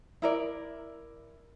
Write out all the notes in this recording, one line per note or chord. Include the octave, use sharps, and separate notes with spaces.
E4 A#4 D5